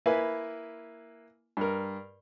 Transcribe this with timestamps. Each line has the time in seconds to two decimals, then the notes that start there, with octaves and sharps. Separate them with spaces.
0.06 A#3 E4 B4 G#5
1.57 G2 A#4